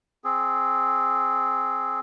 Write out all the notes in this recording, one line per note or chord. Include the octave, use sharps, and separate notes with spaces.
C4 G#4